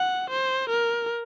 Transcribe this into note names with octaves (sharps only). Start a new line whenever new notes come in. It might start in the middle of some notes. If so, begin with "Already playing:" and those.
Already playing: F#5
C5
A#4